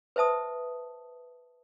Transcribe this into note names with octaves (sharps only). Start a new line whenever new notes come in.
B4 C5 E5 A5 D#6